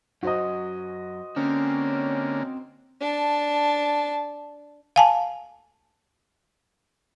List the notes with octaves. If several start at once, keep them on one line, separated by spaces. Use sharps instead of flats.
F#2 F#4 C5 D#5
D3 A#3 C4 C#4
D4 A5
F5 G#5 A5